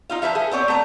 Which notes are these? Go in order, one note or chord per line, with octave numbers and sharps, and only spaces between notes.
D#4 F4 F5
F3 B4 E5 F5
G#4 A4
B3 C4 C#5 D5
A3 A#5